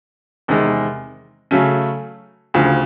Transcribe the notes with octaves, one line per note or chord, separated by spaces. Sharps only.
E2 C3 D#3 G#3
C#3 F#3 A3 C#4
D2 C#3 F3